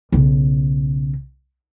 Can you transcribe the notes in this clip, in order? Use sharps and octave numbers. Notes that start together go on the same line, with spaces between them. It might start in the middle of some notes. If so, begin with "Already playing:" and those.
B1 C#3